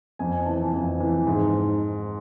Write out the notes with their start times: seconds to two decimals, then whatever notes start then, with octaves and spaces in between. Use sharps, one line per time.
0.19 F2 G#5
0.46 E3 A5
0.73 F2
1.00 E3
1.27 G#2